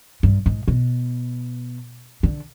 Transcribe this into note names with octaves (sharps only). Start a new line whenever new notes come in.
G2
G#2
B2
D3